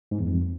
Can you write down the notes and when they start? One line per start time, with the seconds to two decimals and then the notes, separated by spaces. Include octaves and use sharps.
0.11 G#2
0.20 E2
0.28 F2